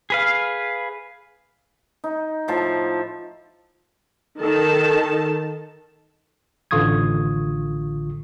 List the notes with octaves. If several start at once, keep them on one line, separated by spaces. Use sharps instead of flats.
G#4 B4 F5
D#4
A2 F3 A5
D#3 A4 A5
A1 D3 F4 C#6 D#6 G#6